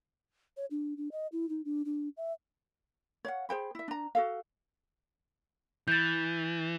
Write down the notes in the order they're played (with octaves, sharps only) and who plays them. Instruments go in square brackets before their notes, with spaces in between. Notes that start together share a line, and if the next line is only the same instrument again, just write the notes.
[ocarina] C#5
D4
D4
D#5
E4
D#4
D4
D4
E5
[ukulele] C#5 F5 F#5
G#4 C5 G5 B5
E4 E5
D4 A#5
F#4 A4 F5
[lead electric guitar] E3 [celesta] G6 A6